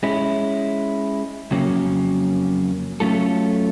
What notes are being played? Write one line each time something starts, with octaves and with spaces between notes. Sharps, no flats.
G#3 C#4 E4
F2 C#3 F#3 A#3 C#4
F#3 A3 C#4 F4 A4